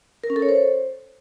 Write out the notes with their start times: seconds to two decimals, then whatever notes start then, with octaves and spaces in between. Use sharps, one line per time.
0.24 A#4
0.30 C#4
0.36 A4
0.42 C#5
0.49 C5